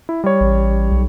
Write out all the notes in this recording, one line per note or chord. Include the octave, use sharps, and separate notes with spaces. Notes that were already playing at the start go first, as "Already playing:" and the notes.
E4
G3 C#5
A1
B1